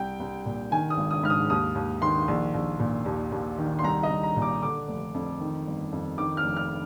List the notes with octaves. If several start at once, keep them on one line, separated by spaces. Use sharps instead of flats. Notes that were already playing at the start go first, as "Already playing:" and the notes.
Already playing: C2 G5
C2
A#2
D#3 G#5
D#6
G#1
D#6
G#2 F6
D#6
D#2 D#6
D#2
D#3 C6
A#1
A#1
A#2
D#2
D#2
D#3
C6
C2 A#5
D#5
C2
A#5
A#2
D6
D3 D6
F1
F2
D#3
G1
F2
D#3 D6
F6
F1
F6